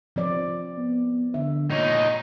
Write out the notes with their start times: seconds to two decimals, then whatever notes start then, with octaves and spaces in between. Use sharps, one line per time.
0.16 F3 C4 D5
0.78 B3
1.34 D3 E5
1.71 A#2 D#4 C#5